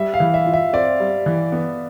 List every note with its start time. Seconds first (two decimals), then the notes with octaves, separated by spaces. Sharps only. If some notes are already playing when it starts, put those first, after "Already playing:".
Already playing: G3 E5
0.14 F5
0.20 E3
0.34 E5
0.46 F4
0.53 E5
0.73 C4 D5
1.00 G3
1.26 E3
1.52 B3